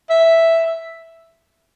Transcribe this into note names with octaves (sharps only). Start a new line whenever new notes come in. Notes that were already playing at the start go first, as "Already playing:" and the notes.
E5